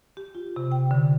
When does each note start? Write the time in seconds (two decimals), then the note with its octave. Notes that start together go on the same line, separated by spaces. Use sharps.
0.17 G4
0.35 F4
0.56 C3
0.72 G5
0.91 D3